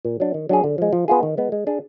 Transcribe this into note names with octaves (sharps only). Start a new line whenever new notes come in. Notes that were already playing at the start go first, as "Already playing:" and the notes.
A#2
F#3 D4
D#3
F#3 D4 G#4
D3
F3 G#3
F3
B3 F4 G#4
D#3
G#3 B3
G#3
D4 G#4